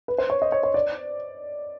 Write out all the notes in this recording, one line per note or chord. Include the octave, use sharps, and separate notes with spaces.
B4
C5
C#5
D#5
C#5
C#5
D5